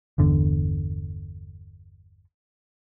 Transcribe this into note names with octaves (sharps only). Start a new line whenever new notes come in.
G1 E2 D3